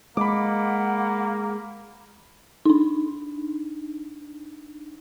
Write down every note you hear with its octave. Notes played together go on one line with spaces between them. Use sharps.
G#3 A#3 F#5 B5 D6
D4 D#4